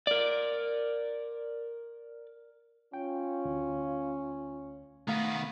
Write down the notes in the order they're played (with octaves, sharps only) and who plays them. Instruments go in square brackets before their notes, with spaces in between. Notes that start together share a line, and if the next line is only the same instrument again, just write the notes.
[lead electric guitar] A#4 D5
[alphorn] C#4 [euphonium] F4 [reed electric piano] G5
[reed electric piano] D2
[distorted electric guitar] D#3 B3 [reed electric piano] A3 F5